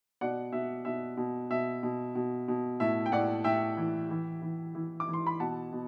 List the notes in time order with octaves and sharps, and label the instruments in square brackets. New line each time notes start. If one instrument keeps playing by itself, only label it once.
[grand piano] B2 D5 F#5
B2 E5
B2 E5
B2
B2 E5
B2
B2
B2
A2 E5
G5
A2 D5 F#5
A2 E5 G5
E3
E3
E3
E3
D6
E3
C6
B5
B2 F#5 A5
B2